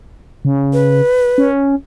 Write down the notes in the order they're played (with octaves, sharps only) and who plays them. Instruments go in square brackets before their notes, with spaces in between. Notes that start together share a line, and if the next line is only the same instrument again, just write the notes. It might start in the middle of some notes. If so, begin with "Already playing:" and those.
[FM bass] C#3
[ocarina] B4
[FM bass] C#4